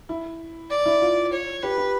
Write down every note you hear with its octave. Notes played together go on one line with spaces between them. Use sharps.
E4
D5
E4
F4
C#5
G4 B4
G4